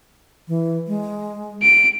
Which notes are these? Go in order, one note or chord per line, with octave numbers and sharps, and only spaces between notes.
E3
G#3
D7